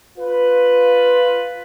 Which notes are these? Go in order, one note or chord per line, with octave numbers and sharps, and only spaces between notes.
F4 B4